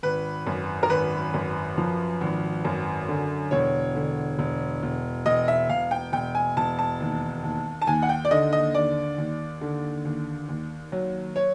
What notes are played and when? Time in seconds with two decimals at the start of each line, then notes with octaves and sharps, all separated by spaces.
0.03 G#1 B4
0.47 F#2
0.83 A#4
0.90 G#1 B4
1.34 F#2
1.77 F3
2.21 G#1
2.65 F#2
3.08 D3
3.51 E1 C#5
3.95 D3
4.39 E1
4.83 E1
5.26 E1 D#5
5.48 E5
5.69 E1 F5
5.91 G5
6.12 E1 G5
6.35 G#5
6.57 E1 A5
6.79 A5
7.00 D#2
7.44 D#2
7.82 A5
7.87 D#2 G#5
8.02 F#5
8.09 G5
8.25 D5
8.31 D3 D#5
8.53 D#5
8.75 D#2 D5
9.18 D#2
9.61 D3
10.05 D#2
10.49 D#2
10.92 F#3
11.36 C#5